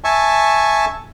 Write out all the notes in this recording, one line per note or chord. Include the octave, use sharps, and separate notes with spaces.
E5 G#5 A5 C#6